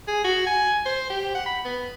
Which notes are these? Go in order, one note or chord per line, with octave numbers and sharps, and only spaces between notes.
G#4
F#4
G#5
C5
G4
F#5
B5
B3